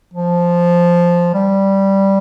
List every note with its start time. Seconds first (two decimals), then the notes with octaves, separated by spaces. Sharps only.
0.14 F3
1.34 G3